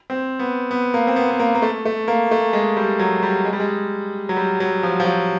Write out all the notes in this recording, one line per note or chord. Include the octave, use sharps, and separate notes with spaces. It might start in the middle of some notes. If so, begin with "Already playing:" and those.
C4
B3
B3
A#3
C4
B3
B3
A#3
A#3
A3
A3
A#3
A3
G#3
G3
F#3
G3
G#3
G3
G#3
F#3
G3
F#3
F3
F3
F#3